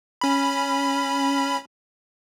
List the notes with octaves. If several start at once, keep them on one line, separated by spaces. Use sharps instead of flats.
C#4 B5